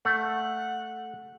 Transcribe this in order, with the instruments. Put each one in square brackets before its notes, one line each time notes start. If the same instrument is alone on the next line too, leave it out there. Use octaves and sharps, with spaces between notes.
[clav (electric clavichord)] A3 [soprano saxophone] F#5